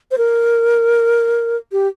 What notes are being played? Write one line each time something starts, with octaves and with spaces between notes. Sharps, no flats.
C5
A#4
G4